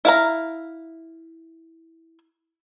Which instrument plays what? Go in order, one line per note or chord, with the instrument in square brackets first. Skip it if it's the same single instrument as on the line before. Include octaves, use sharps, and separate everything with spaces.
[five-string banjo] E4 F5 A#5